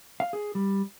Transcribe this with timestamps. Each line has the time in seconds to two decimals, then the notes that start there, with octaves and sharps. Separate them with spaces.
0.20 F5
0.33 G#4
0.55 G3